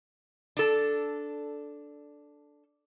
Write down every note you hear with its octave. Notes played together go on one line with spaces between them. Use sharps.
D4 A4